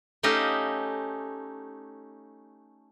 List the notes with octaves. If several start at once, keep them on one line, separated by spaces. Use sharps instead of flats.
A3 C#4 D#4 G4 D#5 F5